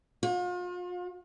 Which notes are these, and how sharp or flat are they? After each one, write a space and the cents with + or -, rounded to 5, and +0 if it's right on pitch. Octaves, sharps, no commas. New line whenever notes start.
F4 +40